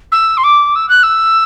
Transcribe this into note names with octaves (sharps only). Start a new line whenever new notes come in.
E6
C6
D6
E6
F#6
E6